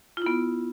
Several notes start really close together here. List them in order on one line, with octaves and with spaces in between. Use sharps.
F4 E4 B3